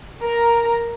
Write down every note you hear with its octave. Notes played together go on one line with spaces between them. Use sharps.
A#4 A#5